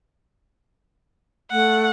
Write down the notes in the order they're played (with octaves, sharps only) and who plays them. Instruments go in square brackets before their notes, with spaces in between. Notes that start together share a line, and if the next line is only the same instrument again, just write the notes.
[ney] A3 [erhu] F#5